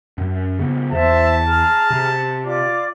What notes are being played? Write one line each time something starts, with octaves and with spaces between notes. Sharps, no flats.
F#2
C#3 B3
E2 C5 E5 A5
G#4 A#5 F6
C3
F4 D5 D6